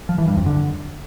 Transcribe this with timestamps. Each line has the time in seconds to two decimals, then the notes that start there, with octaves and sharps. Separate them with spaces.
0.09 F3
0.18 E3
0.28 G2
0.37 F2
0.46 D3